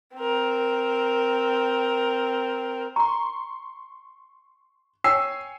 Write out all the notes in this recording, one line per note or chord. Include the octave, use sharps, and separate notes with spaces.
C4 A#4
A#5 C6 C#6
C#5 G5 G#5 E6 C7